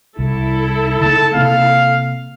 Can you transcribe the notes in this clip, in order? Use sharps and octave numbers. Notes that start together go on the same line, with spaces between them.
C2 E4 A4
C#3 A3 A5
C3 A#3 C4 F5